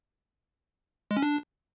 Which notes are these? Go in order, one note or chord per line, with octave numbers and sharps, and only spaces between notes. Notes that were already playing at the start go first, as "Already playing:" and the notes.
G#3
C#4
D4